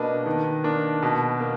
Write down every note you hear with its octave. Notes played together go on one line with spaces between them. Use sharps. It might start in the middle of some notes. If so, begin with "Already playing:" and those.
Already playing: B2 A#3 D4 B4 D#5
D#3
A#3 D4
B2
A#3